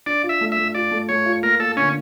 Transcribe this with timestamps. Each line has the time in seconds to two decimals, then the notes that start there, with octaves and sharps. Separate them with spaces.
0.06 D4 D5
0.23 F4
0.29 E5
0.41 A3
0.52 E5
0.57 A3
0.75 F4 D5
0.91 A3
1.09 A3 C#5
1.26 F4
1.43 A#3 A#4
1.60 A#3 A4
1.77 D3 C#4